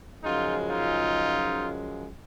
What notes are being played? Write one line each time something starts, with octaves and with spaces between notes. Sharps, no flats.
F#2 C#3 F3 G#3 D#4 F4
D#4 F4